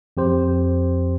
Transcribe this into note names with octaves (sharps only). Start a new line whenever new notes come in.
F2 G4 C5